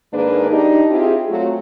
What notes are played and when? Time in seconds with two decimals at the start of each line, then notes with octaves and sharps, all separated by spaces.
0.12 G#2 D#3 A#3 D4 G#4 B4
0.50 D4 D#4 G4
0.90 C4 E4 F4 G4 G#4
1.29 F#3 A3 C4 F4 F#4